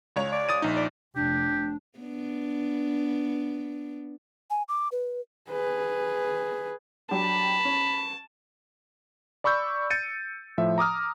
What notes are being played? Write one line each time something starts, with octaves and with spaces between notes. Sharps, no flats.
C#2 C#5 F7
D5
D#6 A6 D#7
A#1 D#4
D5
F1 D4 G4
B3 D4
G#5
D6
B4
G#4 B4
F#3 D4 G4 A5 B5
C#4
D5 B5 C#6 E6 G6
G6 A6 C#7 D#7
A2 F3 E5
A#5 D6 D#6 F6